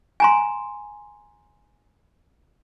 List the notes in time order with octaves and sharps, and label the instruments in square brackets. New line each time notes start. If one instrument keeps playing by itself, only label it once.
[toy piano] G#5 A#5 C6